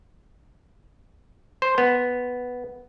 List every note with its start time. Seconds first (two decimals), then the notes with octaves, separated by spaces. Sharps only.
1.62 C5
1.78 B3